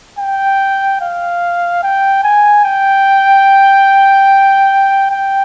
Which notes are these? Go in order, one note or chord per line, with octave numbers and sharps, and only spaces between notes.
G5
F5
G5
G#5
G5
G5